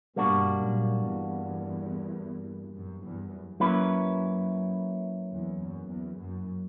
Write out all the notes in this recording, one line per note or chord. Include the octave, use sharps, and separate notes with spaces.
G2 B2 G3 A#3 D4 F#4
F#2 A#2
E2 G2
F#2
E2 G2
F#2
F#3 A#3 C#4 E4 B4
E2
F#2
E2
F#2